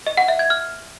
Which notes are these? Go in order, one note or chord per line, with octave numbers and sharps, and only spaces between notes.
D#5
F#5
E5
G#6
F6